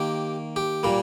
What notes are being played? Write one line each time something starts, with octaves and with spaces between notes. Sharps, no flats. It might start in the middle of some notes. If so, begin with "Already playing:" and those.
Already playing: D#3 A#3 G4
G4
A#2 G3 A#3